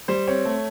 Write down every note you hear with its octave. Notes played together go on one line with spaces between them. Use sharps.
G3 C5
C4 C#5
A3